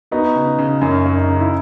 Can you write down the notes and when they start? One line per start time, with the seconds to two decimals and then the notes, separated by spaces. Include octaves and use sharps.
0.11 B3 D#4 F#4
0.36 C#3
0.59 C#3
0.81 F#2 C#4
1.05 F#2
1.17 D#4
1.28 C#3
1.40 E4